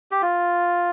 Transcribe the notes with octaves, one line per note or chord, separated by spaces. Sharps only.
G4
F4